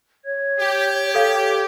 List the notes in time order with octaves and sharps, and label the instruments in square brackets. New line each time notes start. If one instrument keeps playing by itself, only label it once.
[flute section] C#5 G#6
[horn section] G4
[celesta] A4 F5